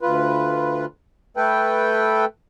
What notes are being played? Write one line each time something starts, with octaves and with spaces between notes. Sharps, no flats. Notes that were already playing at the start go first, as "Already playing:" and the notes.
D2 F4 B4
A3 A4 B4 G5